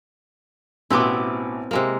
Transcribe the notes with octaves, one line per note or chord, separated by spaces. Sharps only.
A1 B2 B3 C4 E4 D6
C3 G#3 A#3